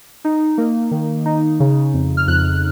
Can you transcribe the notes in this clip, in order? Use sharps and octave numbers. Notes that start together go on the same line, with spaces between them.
D#4
A#3
D#3
D#4
C#3
F2
F6
F2 F#6